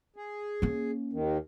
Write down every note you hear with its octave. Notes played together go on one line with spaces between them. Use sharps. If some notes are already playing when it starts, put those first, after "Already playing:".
G#4
A#3 C#4
D#2 D#3